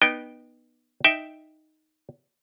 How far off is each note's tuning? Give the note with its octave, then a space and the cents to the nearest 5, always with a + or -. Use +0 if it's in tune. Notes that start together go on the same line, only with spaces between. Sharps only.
B3 -15 D#4 -25 G5 +0
D#4 +0 E5 +0 G5 +0